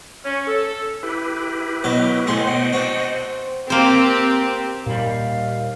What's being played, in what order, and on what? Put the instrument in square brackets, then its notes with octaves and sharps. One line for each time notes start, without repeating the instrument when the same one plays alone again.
[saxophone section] C#4
A4
[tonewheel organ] E4 G4 B4
[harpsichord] B2 F#3 D#5
[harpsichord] A2 G#4 C6 [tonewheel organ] C5 D#5 F#5
[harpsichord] B2
C4 D4 F#4
[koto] A#3 C5 [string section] C4 G4
[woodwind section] D#2 F5 [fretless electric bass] A#2 G3